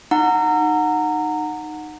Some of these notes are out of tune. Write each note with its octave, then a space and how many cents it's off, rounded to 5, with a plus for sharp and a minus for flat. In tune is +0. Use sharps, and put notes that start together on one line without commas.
D#4 -15 F#5 -15 A#5 -20